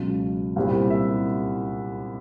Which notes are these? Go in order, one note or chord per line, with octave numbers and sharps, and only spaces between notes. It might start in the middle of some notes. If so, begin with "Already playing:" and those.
Already playing: C#2 B2 F#3
C2 A#2 G3 C4 E4
E5